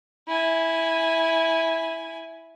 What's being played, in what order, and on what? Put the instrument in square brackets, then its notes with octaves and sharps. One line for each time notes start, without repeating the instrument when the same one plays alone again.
[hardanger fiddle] E4 G#5